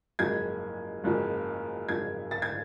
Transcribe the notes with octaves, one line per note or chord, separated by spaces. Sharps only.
F#1 F#2 F3 G#3 G#6
F#1 F#2 F3 G#3
F#1 F#2 F3 G#3 G#6
A6
G#6